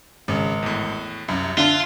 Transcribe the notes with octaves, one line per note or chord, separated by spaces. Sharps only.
G#1 C#3
E2 A2
C2 F#2
D3 F4 E5 F5 A5